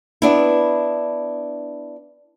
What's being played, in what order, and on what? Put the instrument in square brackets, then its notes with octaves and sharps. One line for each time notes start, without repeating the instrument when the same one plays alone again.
[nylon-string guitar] B3 D4 E4